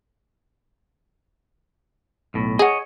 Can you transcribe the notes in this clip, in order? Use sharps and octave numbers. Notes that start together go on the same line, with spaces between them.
B1 A2
G#4 C#5 D#5 F#5